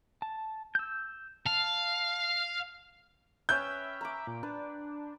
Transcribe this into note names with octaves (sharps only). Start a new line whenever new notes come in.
A5
E6 G6
F5 A5
C#4 B4 E5 G5 G6
A#5 B5 D6
A#2
D4 B4